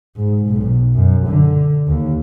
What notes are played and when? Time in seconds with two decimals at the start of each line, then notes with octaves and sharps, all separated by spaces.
0.16 G#2
0.45 B1
0.95 F#2
1.27 D3
1.87 D#2